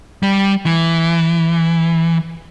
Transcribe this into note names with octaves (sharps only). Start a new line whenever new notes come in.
G3
E3